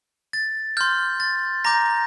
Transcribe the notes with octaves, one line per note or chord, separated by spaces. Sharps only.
A6
C6 F6 G6
A6
A#5 D6 G6 A#6